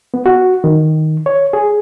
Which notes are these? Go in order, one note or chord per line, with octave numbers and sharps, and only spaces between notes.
B3
F#4
D#3
C#5
G#4